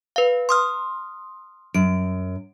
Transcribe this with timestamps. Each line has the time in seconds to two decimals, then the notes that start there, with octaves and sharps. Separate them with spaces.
0.16 B4 F5
0.49 C6 D#6 F6
1.74 F#2 D7